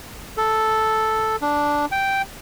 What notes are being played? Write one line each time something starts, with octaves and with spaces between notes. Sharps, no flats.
A4
D4
G5